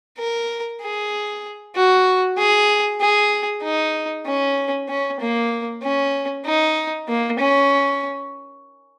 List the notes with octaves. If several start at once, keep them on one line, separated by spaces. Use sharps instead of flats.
A#4
G#4
F#4
G#4
G#4
D#4
C#4
C#4
A#3
C#4
D#4
A#3
C#4